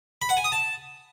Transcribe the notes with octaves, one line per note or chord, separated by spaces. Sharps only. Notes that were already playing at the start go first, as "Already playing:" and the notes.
B5
F#5
G#5
D#6
A5